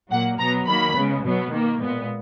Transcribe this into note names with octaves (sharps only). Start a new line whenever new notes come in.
A#2 F#3 A#3 F#5
B2 F#3 B3 A#5
D#3 F#3 A#3 B5
C#3 G#3 B3
B2 F#3 B3
D#3 A#3
A#2 G#3 B3